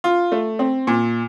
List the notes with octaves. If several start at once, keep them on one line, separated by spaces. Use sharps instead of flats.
F4
A3
C4
A#2